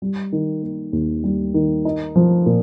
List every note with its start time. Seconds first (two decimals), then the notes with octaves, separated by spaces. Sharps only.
0.02 G3
0.32 D#3
0.62 A#3
0.93 D#2
1.24 G3
1.54 D#3
1.85 D#4
2.16 F3
2.46 A#2